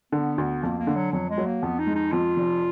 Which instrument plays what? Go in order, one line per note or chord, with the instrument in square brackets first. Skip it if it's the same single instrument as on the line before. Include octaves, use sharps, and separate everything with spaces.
[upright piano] D3 [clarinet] B3
[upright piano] D2
[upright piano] F2 [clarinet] A#3
[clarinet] A#3
[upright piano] D3
[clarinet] F#3
[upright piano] F2 [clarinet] F#3
[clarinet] G#3
[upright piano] F#3
[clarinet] A#3
[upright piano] F2 [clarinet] B3
[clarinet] D#4
[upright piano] G#3
[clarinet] D#4
[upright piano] F2 [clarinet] F4
[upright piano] F1